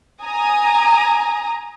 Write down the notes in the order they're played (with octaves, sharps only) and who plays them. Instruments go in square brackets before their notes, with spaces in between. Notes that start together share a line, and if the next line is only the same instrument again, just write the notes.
[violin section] G#5 A#5 D#6